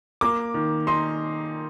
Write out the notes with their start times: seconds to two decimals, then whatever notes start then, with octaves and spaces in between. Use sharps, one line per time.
0.21 A#3 D6
0.54 D#3
0.87 D#4 C6